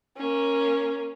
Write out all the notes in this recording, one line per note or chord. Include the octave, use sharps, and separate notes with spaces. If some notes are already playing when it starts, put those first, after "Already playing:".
A#3 C#4